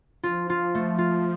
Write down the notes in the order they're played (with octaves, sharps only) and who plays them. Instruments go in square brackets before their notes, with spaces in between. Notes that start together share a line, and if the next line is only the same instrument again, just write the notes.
[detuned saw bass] F3 [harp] F4
[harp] F4
A3
F4